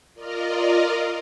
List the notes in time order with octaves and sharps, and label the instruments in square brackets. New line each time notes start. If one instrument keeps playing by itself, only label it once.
[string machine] F4 A#4 D5 D#5 F5